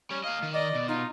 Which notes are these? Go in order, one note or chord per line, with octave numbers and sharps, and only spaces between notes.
G3 C#4
A#3 D#5 F5
D#3
D5 D#5
B2
D#4 F4